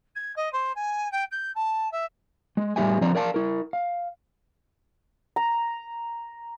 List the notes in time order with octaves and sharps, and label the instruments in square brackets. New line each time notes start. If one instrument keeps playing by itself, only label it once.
[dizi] G#6
D#5
C5
G#5
G5
G6
A5
E5
[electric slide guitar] G#3
A2 G3 D4 G4 E5 G#5
F3 C4 D4 D5 A#5
A#4 D5 F5 A5
E4 A#4
F5
[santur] A#5